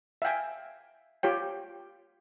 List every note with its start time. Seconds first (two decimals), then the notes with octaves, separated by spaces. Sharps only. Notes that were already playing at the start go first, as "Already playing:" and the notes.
0.22 E5 F5 G5 G#5
1.23 F4 G4 C#5 G5